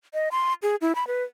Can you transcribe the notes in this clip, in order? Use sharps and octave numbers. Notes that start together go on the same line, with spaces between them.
D#5
C6
G#4
E4
B5
B4